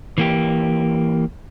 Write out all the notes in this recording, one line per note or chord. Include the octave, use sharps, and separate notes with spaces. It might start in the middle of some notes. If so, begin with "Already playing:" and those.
E3 A#3 G4